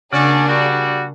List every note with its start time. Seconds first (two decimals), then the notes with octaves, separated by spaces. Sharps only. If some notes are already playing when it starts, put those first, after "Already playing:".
0.13 C#3 A#3 C#4 D4 F#4 G#4 D5
0.48 G3 F#4